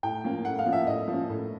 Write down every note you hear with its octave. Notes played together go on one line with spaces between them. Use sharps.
A2 G5
F3 A#3 C#4
A2 F#5
F5
F3 A#3 C#4
E5
A2 D#5
F3 A#3 C#4
A2